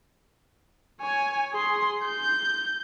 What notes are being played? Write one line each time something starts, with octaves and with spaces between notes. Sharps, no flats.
C#5 G#5
G#4 C6
G6